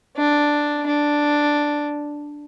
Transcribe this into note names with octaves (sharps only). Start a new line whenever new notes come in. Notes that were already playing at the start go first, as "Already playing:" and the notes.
D4
D4